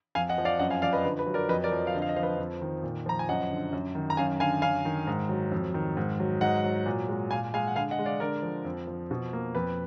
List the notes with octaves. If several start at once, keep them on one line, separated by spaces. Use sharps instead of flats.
F2 F5 G#5
D#5 F#5
F3
D5 F5
F#2 D#5 F#5
F5 G#5
F3 D5 F5
B4 D#5
D3 B4
B4
F#3
A#4 D5
F2 B4 D#5
A#4 D5
F3
D#5
F5
D3 D#5
F5
D#5
F3 F5
B4 D#5
F2
D#3
A#2
F3 A#5
G#5
F#2 D#5 F#5
D3
F#2
D#3
A#5
F#2 F5 G#5
D3 F5 G#5
F#2 F5 G#5
D#3
G#2
F#3
F2
D#3
G#2
F#3
G#2 D#5 F#5
F#3
A#2
G#3
A#2 F5 G#5
G#3 F5 G#5
F#5
D3 F5 G#5
D#5 F#5
G#3
D5 F5
D3 A#4 D5
F3
F2
F3
B2
A#3
F2 B4